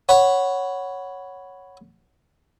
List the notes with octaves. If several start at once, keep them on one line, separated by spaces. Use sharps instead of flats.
C#5 F#5 B5